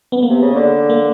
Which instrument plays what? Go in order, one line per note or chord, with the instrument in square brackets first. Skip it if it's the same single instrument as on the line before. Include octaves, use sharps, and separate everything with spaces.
[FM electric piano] B3
A#3
[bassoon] C3
C#3
D3
[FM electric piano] A#3